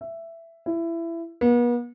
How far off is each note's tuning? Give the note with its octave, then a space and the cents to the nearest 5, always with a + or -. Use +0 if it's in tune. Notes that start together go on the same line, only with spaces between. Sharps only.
E5 +10
E4 +20
B3 -40